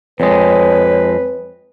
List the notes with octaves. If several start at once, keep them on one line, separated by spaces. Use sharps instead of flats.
F2 G#3 B4 C#5